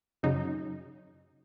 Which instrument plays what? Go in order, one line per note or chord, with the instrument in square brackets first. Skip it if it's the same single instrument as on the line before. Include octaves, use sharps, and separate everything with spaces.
[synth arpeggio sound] F#2 C#3 F#3 D#4